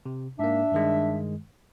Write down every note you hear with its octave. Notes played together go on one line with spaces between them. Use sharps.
C3
G#2 A#3 D4 E5
G2 D#3 G#3